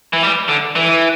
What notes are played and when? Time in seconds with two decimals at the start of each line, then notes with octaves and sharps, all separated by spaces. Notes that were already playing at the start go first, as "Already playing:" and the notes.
0.13 E3
0.23 G3
0.48 D3
0.76 E3